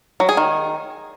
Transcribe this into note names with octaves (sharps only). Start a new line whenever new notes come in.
F#3
G#4
D#3